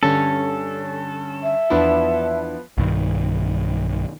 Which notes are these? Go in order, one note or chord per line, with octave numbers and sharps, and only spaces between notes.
G2 D3 C#4 A4
E5
E2 F3 B3 D4 E4 B4
B1 G2 D#3